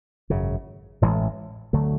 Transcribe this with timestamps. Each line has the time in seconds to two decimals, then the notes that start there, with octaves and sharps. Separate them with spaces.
0.30 G#1 F#2 C#3
1.02 A1 A2 E3 G#3
1.73 D2 D3 F#3 A3